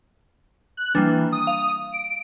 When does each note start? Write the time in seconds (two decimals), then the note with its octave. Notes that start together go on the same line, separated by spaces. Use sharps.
0.77 F#6
0.95 E3 G3 A#3 D4
1.32 D#6
1.47 F5
1.92 D7